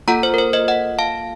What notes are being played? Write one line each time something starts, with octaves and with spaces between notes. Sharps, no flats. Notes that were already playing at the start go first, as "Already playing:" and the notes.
A#3 F4 A4 F#5 A#5
C5
A#4
C5
C5 D#5
D#5 F#5
F5 A5